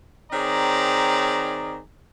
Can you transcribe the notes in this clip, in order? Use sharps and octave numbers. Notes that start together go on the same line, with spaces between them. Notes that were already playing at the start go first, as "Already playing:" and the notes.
D#3 C4 G#4 C#5 D5 A#5